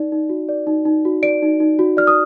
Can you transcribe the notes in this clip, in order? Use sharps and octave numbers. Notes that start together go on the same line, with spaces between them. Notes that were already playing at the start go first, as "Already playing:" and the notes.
Already playing: D#4 D5
D#4
F#4
D5
D#4
D#4
F#4
D5 D7
D#4
D#4
F#4
D5 F6
D#6